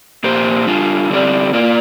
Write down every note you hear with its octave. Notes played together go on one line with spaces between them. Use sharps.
A#2 A#3 G4 C5
G3 D4 F4
D3 G3 C4 G4 D5
A#3 F4 A#4 D5